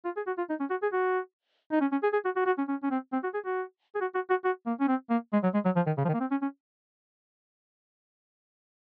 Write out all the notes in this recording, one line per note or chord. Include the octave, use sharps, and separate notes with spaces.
F4
G#4
F#4
F4
D#4
C#4
F#4
G#4
F#4
D#4
C#4
C#4
G#4
G#4
F#4
F#4
F#4
C#4
C#4
C#4
C4
C4
F#4
G#4
F#4
G#4
F#4
F#4
F#4
F#4
A#3
C#4
C4
A#3
G#3
F#3
G#3
F#3
F3
D#3
C#3
F3
D#3
A#3
C4
C#4
C#4